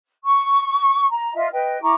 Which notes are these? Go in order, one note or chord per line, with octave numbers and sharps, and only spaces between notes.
C#6
A#5
F4 D#5 E5
B4 D#5 G5
E4 A#5 C#6 D6